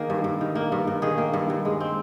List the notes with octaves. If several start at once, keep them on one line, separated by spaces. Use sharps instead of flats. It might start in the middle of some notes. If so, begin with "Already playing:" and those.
Already playing: D#3 A#3 G#4
G2
G2
D#3
A#3
G2
G2
D#3 G#4
A#3
G2
G2
G#3
C4